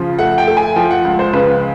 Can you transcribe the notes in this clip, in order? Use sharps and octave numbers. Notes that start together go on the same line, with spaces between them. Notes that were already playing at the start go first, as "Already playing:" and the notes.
Already playing: C#3 F3
A3 F#5
G5
A3
G#5
F3 G5
F#5
C#2
C5
C#3 B4